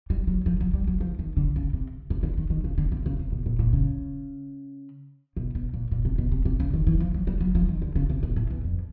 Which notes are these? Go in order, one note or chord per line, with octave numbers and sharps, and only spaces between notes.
G3
F#3
F3
F#3
G3
F#3
F3
D#3
D3
C#3
C3
C3
D3
D#3
D#3
C#3
D3
C3
C#3
C3
B2
A#2
A#2
C#3
B2
B2
A#2
A#2
C3
B2
C3
C3
C#3
D#3
E3
F3
F#3
G3
F#3
F3
D#3
D3
C#3
C3
B2
A2
E2
F2